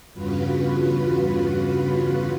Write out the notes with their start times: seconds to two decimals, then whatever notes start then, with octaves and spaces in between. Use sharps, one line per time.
0.14 E2 G2 C#3 F4 F#4 B4